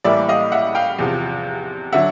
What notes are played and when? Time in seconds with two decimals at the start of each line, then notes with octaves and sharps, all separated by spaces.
0.04 A2 E3 G3 A#3 D5 E5
0.29 D#5 F5
0.52 E5 F#5
0.75 F5 G5
0.99 E2 C3 F3
1.93 D3 F#3 E5 F#5